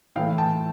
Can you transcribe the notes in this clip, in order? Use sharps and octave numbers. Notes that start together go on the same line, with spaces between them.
A2 E3 A3 F5 G5
G5 A5